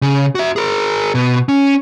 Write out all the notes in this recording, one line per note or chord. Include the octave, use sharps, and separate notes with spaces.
C#3
F#4 E5
G#4 A#4
B2
C#4